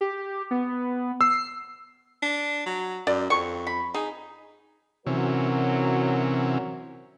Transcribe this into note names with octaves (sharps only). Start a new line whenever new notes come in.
G4
B3
E6 C7
D4
F#3
F#2 D5
F2 C#6
B5
D#4 G#4
C3 E3 F#3 C#4 A#4